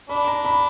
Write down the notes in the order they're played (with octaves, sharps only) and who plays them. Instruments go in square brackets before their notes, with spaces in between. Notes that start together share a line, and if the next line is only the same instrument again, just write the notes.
[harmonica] D4 [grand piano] B5
[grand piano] A#5
B5